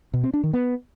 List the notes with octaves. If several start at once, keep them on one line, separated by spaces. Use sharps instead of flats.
B2
C4
D4
D#3
B3